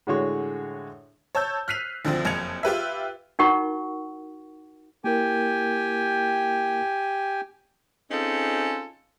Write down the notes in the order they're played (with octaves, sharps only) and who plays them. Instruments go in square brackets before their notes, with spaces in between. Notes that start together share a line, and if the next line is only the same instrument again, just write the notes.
[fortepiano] A2 D3 G#3 F#4 C#5 C#6
[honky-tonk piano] C#5 A5 E6 G6
F6 F#6 B6 C7 D#7 F7
D2 D3 F3 C4
F#1 F2 G#6 C#7 F7
F4 G4 B4 E5
[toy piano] D#4 E4 F#4 A#4 F#5 C#6
[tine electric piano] A#3 E4 A#4 [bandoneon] G4 G5 G#5
[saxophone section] C4 C#4 D#4 F4 G#4 A4